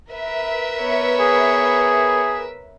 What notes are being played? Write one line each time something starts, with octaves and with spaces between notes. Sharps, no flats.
A#4 B4 E5
B3 C#5
G#4